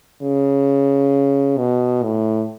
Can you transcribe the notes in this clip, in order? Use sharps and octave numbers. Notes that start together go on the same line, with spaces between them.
C#3
B2
A2